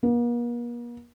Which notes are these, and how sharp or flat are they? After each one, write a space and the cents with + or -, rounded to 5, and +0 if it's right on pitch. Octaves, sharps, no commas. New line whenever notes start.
A#3 +45